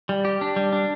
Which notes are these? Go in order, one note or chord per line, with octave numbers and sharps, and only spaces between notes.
G3
G4
D4
G3
D4